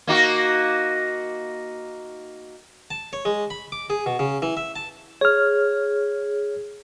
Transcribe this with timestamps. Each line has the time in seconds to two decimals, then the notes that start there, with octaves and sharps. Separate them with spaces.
0.07 A#3 D#4 F#4
2.91 A5
3.13 C#5
3.25 G#3
3.50 B5
3.72 D6
3.90 G#4
4.06 B2
4.19 C#3
4.42 E3
4.57 E5
4.76 A5
5.21 G#4 C#5 F6